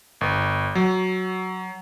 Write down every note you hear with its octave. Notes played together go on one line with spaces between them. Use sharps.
G1
F#3